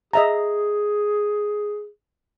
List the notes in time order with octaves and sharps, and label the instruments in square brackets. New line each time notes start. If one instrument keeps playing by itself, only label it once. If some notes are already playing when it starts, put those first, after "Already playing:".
[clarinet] G#4 [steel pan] D#5 E5 A#5